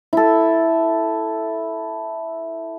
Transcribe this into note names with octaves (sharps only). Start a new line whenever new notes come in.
E4 A4